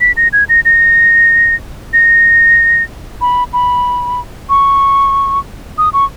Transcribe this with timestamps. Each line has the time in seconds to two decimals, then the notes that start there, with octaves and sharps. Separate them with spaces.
0.01 B6
0.17 A#6
0.33 G#6
0.49 A#6
0.65 A#6
1.93 A#6
3.21 B5
3.53 B5
4.49 C#6
5.78 D#6
5.93 C#6